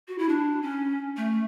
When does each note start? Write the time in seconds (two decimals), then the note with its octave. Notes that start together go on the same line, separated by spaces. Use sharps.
0.08 F#4
0.19 E4
0.29 D4
0.62 C#4
1.17 A3